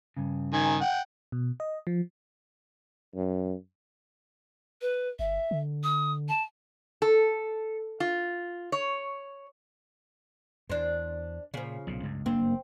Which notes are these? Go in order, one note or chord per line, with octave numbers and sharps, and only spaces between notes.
G2 C#3
D#3 G#5
F#5 G5
B2
D#5
F3
F#2
B4
G1 E5
D3
D#6
A5
A4
F4
C#5
E2 D4 C5
A#2 C#3 F3
B1 A#2
C#2 G2
F#1 G2 A#3 C4 D4